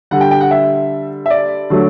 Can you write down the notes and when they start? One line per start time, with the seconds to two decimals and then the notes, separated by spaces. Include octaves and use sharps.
0.11 D3 G3 F#5
0.21 G5
0.31 G5
0.41 F#5
0.51 E5
1.26 E5
1.30 D5
1.70 D3 F#3 A3